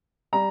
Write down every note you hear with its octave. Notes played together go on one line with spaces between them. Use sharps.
G3 A#5